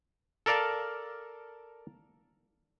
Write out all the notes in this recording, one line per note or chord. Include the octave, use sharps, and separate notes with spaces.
A4 A#4 D5 F5 A5